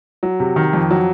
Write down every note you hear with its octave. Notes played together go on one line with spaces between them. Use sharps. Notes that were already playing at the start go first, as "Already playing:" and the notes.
F#3
C3
D#3
F2
F#3